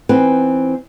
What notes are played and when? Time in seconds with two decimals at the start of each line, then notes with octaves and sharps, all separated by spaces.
0.09 E3 B3 C4 D#4 B4